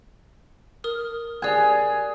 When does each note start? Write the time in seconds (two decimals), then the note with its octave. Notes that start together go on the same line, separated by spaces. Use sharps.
0.84 A#4 D#6 F6
1.42 G4 G#4 D5 G#5 F#6